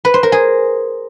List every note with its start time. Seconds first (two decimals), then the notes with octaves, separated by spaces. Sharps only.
0.05 B4
0.14 C5
0.23 A#4
0.32 G#4